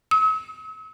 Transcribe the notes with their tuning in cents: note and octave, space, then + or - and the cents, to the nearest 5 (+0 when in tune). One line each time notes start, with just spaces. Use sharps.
E6 -45